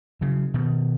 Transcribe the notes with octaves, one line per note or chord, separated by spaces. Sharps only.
C#3 F#3
B2 D#3